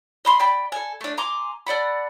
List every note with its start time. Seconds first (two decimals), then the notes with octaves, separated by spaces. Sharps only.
0.25 D#5 B5 C6
0.39 D5 G5 B5
0.72 A4 G#5
1.01 A3 D4
1.17 G#5 A#5 C6 D6
1.67 A4 D5 F#5 B5